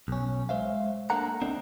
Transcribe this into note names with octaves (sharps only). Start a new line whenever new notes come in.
B1 C#4
G#3 C5 E5 F5
A#3 D4 A4 A#4 F#5 A#5
C#2 A3 C4 D4 D#4